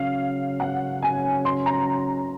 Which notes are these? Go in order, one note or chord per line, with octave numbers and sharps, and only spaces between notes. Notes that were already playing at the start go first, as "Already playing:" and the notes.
Already playing: C#3 F#3 C#4 F5
F#5
G#5
C6
A#5